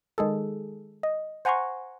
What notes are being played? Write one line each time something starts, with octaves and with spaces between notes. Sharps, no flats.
D#3 G#3 G#4 A4
D#5
C5 F#5 G#5 A#5 C6 C#6